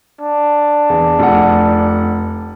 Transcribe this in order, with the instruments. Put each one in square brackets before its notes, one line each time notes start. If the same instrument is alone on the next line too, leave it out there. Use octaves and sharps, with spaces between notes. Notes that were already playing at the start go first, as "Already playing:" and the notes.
[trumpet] D4
[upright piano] E2
F1 F#5